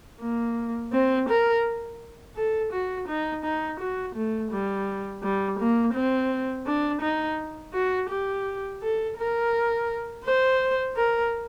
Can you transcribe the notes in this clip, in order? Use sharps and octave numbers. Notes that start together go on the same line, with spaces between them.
A#3
C4
A#4
A4
F#4
D#4
D#4
F#4
A3
G3
G3
A#3
C4
D4
D#4
F#4
G4
A4
A#4
C5
A#4